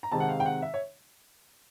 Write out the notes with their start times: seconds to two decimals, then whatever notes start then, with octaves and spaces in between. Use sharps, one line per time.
0.03 A#5
0.12 C3 D#3 G#3 C4 A5
0.20 F#5
0.29 F5
0.40 G5
0.46 F#5
0.62 E5
0.74 C#5